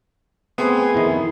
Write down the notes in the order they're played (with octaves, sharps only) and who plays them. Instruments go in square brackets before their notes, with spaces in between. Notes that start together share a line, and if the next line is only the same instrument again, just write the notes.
[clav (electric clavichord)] A3 C4 G#5 [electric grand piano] B3 [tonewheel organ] G#4
[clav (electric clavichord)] F2 D#3 [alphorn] E4